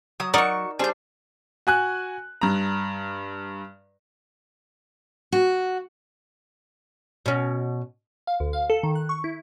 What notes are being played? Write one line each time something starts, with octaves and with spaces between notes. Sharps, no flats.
F#3 D#6
D#4 F#4 A#4 D5 C#6
G3 D4 G#4 C5 G6
F#4 G#5 F#6
G2 A#5
F#4
B2 C#4
F5
D2
F5
A4
D#3
F#6
C#6
E4